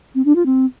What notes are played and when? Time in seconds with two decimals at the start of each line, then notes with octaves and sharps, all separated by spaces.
0.15 C4
0.25 D4
0.35 F4
0.46 C4